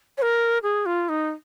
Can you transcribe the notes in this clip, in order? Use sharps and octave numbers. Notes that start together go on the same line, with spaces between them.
C#5
A#4
G#4
F4
D#4